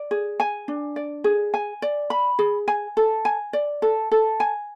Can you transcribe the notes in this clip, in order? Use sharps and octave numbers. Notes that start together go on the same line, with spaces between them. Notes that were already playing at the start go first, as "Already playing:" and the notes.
Already playing: D5
G#4
G#5
D4
D5
G#4
G#5
D5
B5
G#4
G#5
A4
G#5
D5
A4
A4
G#5